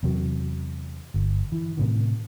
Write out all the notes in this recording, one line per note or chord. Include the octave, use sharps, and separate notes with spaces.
E2 C3 F#3
G1
E3
A2 C3 D#3